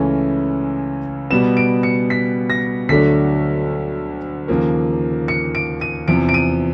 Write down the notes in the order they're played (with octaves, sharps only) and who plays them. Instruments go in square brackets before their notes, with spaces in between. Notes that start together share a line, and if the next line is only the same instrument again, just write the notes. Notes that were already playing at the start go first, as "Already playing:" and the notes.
Already playing: [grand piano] C#2 C#3 E3 A3 C#4
B2 G3 B3 E7
D7
C#7
B6
A#6
D2 D3 F#3 A3 D4 B6
D#2 C#3 F3 A#3
C#7
D7
D#7
E2 C3 F3 D7
D7
D#7